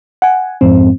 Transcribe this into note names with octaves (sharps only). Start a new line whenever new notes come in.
F#5 G#5
F2 G#2 C4